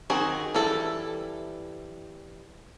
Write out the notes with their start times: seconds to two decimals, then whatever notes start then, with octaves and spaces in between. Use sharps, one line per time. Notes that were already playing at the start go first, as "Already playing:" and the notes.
0.10 D#3 C4 F#4 G#4
0.55 E3 G3 E4 A4